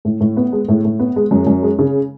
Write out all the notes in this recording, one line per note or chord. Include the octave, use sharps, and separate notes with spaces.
A2
A2
B3
G#3
A2
A2
B3
G#3
F#2
F#2
G#3
C#3